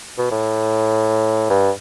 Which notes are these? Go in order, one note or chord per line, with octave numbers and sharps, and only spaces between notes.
B2
A2
G2